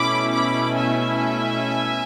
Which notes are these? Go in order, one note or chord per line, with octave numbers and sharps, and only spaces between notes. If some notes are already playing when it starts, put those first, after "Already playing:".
Already playing: B2 A3 C#4 E4 B5 D6
B5 D6
E5 G#5